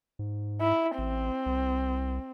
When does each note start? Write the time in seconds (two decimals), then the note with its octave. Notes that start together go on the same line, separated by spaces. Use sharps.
0.19 G#2
0.61 E4
0.98 A1 C4
1.46 C2